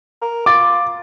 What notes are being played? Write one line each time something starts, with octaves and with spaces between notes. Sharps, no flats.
A#4
F4 D6 A6